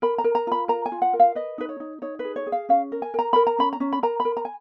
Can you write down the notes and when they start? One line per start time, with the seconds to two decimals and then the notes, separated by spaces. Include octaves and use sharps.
0.02 A#4 B5
0.18 A#5
0.24 A#4
0.35 A#5
0.47 F4 B5
0.68 A#4 A#5
0.86 G#5
0.92 F4
1.02 F#5
1.13 A#4
1.20 F5
1.35 B4 D#5
1.58 D#4 B4
1.69 C#5
1.80 D#4
2.02 D#4 C#5
2.19 B4
2.24 G#4
2.36 C#5
2.47 G#4
2.52 F5
2.69 C#4 F5
2.92 A#4
3.02 G#5
3.14 A#4 A#5
3.33 A#4 B5
3.47 A#5
3.58 C#4 B5
3.73 A#5
3.80 C#4
3.93 B5
4.03 A#4 A#5
4.20 B5
4.25 A#4
4.37 A#5
4.45 G#5